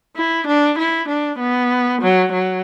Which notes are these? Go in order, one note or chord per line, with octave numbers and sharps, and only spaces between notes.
E4
D4
E4
D4
B3
F#3
F#3